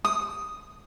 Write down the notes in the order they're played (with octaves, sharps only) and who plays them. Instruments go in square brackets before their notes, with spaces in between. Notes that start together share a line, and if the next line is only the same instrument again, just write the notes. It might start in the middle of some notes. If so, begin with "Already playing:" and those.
[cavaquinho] D#6